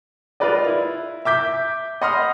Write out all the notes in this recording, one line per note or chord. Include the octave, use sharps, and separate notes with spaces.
F4 A#4 B4 D5 D#5
E4
E5 D6 G6 B6
D#5 F#5 B5 C6 D#6 F6